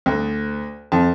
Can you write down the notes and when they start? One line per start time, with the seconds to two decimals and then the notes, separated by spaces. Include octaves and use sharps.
0.06 D2
0.92 F2